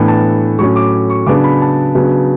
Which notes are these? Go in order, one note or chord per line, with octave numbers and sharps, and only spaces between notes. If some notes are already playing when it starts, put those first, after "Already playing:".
Already playing: A2 E3 B3 D4
A5
A2 F#3 C#4 C#6
D6
C#6
C#3 F#3 B3 D4 D6
B5
A5
C#3 F#3 B3 D4